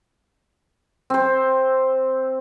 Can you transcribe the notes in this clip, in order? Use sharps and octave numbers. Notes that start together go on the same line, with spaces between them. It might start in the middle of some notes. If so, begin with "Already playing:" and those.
C4 C5